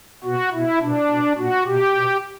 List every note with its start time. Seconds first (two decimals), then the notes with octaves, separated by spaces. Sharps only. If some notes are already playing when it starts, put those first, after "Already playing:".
0.24 B2 F#4
0.53 B2 E4
0.81 B2 D4
1.09 B2
1.38 A#2 F#4
1.66 B2 G4
1.95 B2